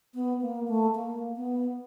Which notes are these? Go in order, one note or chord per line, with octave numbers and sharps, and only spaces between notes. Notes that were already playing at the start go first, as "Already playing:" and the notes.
B3
A#3
A3
A#3
B3